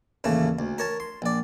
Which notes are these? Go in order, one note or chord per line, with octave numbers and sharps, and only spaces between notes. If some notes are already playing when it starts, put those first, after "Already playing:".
A1 D#2 C#3 A3
D2
A#4 C#5 A5
C6
A#1 D5